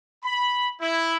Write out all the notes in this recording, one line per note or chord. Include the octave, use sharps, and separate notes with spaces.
B5
E4